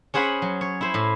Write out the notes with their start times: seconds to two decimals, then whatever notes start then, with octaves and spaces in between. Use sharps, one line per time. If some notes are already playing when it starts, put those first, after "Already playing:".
0.14 C#4 G#4 C5 F#5 G#5 B5
0.42 F#3
0.61 C#5
0.81 E4 C5
0.94 A2